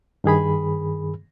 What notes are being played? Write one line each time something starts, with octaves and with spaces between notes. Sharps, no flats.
G2 D#3 G#4 B5